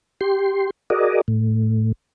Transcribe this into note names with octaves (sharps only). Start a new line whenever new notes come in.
G4 C6
F#4 G#4 A#4 D5 D#5
A2